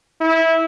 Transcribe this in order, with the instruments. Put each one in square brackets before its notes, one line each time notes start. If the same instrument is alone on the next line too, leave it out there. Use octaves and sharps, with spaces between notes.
[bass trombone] E4